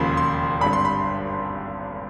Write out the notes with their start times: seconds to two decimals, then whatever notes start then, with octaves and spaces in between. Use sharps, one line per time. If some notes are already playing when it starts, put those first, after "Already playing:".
Already playing: E1 D#2 C#3 F3 A#3 B5 C6
0.17 C6
0.61 G#1 G2 D3 B5
0.73 C6
0.85 B5